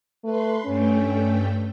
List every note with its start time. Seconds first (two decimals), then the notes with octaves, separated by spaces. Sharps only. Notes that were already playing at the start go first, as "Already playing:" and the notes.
0.24 A3 B4 C6
0.66 G2 A3 C#4 G5